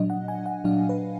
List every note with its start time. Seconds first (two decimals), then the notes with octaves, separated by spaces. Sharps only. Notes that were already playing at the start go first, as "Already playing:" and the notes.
Already playing: A#2 F#3 D4 D#5
0.10 F#5
0.28 G#5
0.46 F#5
0.64 A#2 F#3 D4 F5
0.89 B4